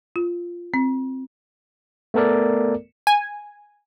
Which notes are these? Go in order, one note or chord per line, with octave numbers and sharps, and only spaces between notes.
F4
C4
A3 B3 A4 A#4 D5
G#5